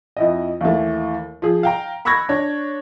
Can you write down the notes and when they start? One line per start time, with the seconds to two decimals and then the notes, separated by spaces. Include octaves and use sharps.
0.17 F2 E4 D#5
0.61 D#2 E3 A3
1.42 F3 G#4
1.63 F5 G5 A#5
2.05 B5 C#6 E6 F#6 G#6 A#6
2.29 D4 C#5